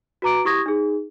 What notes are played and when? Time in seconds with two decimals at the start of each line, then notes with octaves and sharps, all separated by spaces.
0.22 F#4 B4 A#5 D6 D7
0.45 E4 G4 C#6 D#6 G#6 A#6
0.66 D#4 G#4